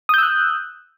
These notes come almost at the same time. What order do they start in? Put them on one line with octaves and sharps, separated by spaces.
D#6 G6 E6 F#6